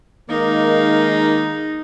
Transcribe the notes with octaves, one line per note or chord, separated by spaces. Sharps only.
D#3 G#3 A#3 D#4